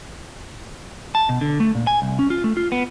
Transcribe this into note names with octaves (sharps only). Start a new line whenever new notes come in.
A5
B2
D3
A3
A#2
G#5
C2
C#4
F4
A3
F4
B3